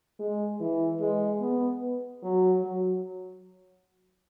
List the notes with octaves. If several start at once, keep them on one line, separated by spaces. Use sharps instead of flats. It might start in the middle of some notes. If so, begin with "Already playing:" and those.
G#3
E3
G#3
B3
F#3
F#3